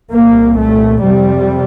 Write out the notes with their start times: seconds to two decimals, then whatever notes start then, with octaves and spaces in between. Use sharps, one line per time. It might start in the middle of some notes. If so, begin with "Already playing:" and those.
0.12 C2 A#2 A#3
0.58 A3
1.03 F2 C3 G3